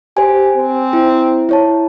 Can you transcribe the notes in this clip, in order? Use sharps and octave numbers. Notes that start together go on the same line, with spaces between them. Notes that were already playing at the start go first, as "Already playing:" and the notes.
G4 C5 G#5
C4
E4
E4 C#5 A5